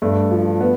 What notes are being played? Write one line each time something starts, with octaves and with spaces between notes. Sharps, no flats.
G2 A3
F3
B3